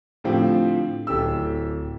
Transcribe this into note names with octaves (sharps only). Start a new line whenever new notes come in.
A2 D3 F3 C4 G4
D1 G4 A4 E6